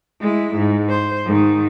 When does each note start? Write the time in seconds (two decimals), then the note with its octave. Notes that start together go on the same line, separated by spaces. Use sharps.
0.21 G#3 E4
0.56 G#2
0.89 C5
1.26 G#2 D#3